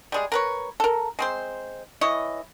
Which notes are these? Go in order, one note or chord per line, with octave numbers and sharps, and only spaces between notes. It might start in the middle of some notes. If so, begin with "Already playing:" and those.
G3 G#3 G#4
A#4 B4 C#5
A4 A#4
G#3 C4 C5
E3 E4 C#5 D#5